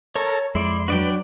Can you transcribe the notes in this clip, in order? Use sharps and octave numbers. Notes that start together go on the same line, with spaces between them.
A4 A#4 C#5 C#6
F2 G#3 E4 D5 C6
F#3 D4 F#4 B4 D5 G5